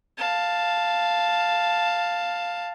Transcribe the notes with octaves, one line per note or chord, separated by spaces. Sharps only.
F5 A5